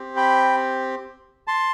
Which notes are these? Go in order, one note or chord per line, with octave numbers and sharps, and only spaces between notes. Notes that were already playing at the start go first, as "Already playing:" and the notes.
Already playing: C4 G4
G5 B5
A5 C6